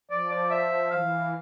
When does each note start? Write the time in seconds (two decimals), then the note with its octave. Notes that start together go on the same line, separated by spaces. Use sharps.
0.11 F3 D5
0.31 D5
0.51 E5
0.91 E3 F5